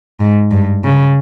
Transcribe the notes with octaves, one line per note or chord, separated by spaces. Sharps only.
G#2
G2
C#3